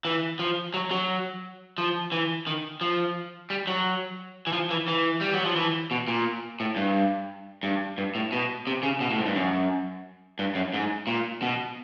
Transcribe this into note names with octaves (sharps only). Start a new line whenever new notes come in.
E3
F3
F#3
F#3
F3
E3
D#3
F3
G3
F#3
E3
F3
E3
E3
G3
F#3
F3
E3
B2
A#2
A2
G2
G2
G2
A2
B2
C3
C#3
B2
A2
G#2
G2
F#2
G2
F#2
G#2
A#2
B2